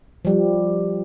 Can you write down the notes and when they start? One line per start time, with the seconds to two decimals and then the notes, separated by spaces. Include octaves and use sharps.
0.25 F3 G3